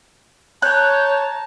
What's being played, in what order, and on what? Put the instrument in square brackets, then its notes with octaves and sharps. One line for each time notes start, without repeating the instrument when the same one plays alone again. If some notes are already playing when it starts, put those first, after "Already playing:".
[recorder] C#5 [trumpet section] A5 A#5 [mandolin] F#6 [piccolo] G6